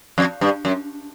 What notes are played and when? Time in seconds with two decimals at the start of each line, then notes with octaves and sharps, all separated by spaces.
0.18 F2
0.41 G2
0.65 F#2